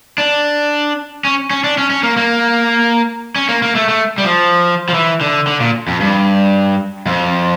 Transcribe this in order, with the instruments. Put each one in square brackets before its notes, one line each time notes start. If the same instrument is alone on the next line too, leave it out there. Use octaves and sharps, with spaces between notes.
[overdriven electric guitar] D4
C#4
C#4
D4
C#4
C#4
A#3
A#3
C#4
A#3
A#3
A3
A3
G3
F3
F3
E3
D3
D3
A#2
F2
G2
F2